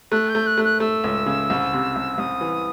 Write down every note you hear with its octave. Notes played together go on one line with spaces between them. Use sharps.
A3 F#6
G6
A3
F#6
A3
F#6
A3 E6
C#2
C#3
C2
C3
C2
C2 D#6
E3